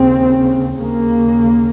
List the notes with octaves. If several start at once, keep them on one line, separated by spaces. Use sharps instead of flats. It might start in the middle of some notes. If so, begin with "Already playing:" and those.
Already playing: D#2 C#3 C4
D#2 C#3 A#3